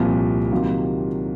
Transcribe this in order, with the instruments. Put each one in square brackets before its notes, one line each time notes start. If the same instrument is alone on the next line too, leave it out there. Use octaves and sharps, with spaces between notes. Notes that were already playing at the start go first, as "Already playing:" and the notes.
Already playing: [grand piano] C2 A#2 F3
C3 D#3 F#3 A#3 F4